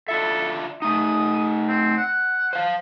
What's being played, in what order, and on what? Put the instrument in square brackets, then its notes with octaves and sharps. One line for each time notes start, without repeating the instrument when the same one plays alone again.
[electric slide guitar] D4 F4 E5 [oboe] A4
[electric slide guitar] A3 D#4 [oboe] D#6
[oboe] C4
F#5
[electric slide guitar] C5 F5